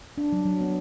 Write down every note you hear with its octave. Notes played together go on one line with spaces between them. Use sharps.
D4
F#3
F#3
B3